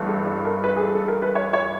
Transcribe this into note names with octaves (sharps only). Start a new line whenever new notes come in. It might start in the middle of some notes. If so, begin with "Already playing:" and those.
Already playing: G1 G2 E3 A3
A4
A4
A#4
B4
G#4
A4
A4
A#4
B4
C#5
C#5